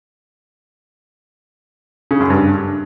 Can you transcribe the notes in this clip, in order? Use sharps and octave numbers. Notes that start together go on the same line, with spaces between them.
C#3
F#2
G2